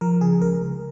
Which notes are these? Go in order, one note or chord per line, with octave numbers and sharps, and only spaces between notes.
F3 A#4
C#3 G#4
C#2 A#4
C#2